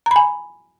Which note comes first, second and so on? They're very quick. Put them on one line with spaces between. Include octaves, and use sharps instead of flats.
A#5 B5 G#5